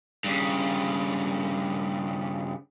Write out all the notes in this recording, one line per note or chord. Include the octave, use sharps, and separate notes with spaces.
G2 C#3